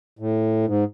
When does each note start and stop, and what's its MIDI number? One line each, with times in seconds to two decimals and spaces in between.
0.19 0.65 45
0.66 0.84 44